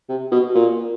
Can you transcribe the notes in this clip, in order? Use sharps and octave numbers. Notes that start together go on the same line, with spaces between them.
C3
B2
A#2